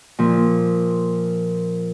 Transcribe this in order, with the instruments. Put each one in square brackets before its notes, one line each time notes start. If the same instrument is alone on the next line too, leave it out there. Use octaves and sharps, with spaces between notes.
[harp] A#2 F3